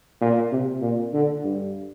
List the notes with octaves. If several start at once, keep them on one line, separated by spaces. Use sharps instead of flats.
A#2
C3
A#2
D3
G2